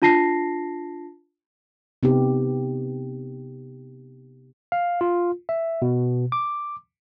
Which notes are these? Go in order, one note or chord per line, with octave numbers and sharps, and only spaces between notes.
D4 F4 A5 A#6 C7
C3 B3 D#4 G4
F5
F4
E5
B2
D6